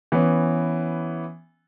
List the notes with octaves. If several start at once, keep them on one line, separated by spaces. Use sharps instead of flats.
E3 B3 C#4